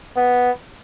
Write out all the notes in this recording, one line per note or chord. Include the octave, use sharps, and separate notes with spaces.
B3